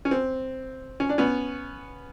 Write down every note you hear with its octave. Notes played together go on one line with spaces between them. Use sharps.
C#4
C4
C#4
D4
B3 C#4